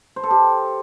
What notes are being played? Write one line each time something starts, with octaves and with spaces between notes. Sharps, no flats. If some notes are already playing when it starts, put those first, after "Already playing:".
C5
A4
G4